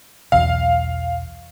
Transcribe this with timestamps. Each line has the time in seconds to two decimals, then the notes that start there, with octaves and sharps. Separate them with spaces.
0.32 B1 E2 F5